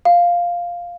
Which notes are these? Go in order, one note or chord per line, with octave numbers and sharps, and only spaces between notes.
F5